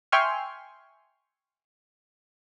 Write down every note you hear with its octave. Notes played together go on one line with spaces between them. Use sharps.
E5 G5 G#5 C6 C#6 F6